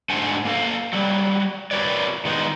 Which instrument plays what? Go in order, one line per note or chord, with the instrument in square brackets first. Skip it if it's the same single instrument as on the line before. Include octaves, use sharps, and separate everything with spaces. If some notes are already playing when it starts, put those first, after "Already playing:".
[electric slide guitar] G#2 A3 D4 C5 F#5 G#5
A#3 A4 F5
F#3 G3
F#4 A#4 B4 C#5 D5
D#3 G#3 B3 D#4